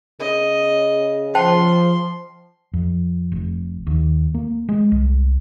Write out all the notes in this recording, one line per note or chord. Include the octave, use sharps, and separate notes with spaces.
C#3 D#5
F3 C5 G5 A5 C6
F2
F1
D#2
A#3
G#3
C2